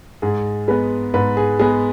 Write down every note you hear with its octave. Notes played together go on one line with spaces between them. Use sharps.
G#2 G#4
G#3 B3 B4
G#2 B4
G#4
G#3 B3 G#4